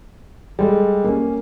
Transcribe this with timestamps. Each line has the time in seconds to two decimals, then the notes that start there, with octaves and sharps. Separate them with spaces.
0.59 G3 G#3 A4
1.04 A#3 C#4